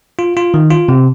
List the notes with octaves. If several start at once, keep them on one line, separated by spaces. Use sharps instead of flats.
F4
F4
D#3
F4
C3